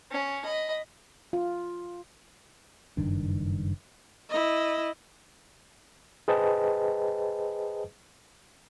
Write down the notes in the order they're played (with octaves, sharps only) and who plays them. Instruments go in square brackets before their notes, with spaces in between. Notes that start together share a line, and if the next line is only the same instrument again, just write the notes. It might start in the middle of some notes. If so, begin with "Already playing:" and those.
[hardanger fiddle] C#4
D#5 B5
[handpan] F4
[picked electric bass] F#1 G2 D#3 D4
[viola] E4 D#5
[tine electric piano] G#4 B4 C5 D#5 G5 A5